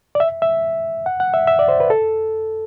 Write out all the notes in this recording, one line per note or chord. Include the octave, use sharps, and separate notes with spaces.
D5
E5
E5
F#5
F#5
E5
E5
D5
C5
B4
A4